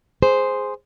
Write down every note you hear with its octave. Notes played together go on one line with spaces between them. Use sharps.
G#4 C5